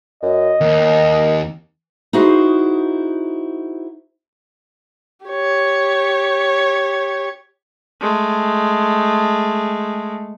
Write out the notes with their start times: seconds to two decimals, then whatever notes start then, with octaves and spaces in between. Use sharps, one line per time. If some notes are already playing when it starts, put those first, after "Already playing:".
0.23 F#2 D#5
0.61 D#2 A#4
2.13 D#4 E4 F#4 G#4 C5
5.26 G4 C#5
8.00 G#3 A3